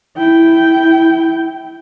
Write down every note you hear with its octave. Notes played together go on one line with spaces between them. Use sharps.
E4 G5